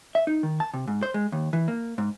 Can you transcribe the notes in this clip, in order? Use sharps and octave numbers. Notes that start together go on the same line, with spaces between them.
E5
D#4
D#3
A5
C3
G#2
C5
G#3
D#2
E3
A#3
G#2